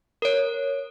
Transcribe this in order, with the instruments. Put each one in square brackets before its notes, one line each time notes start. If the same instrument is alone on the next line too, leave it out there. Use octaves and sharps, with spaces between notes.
[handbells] A#4 C#5